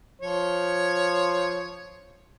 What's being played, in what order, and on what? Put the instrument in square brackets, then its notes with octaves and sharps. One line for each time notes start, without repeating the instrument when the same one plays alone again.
[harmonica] F3 C#5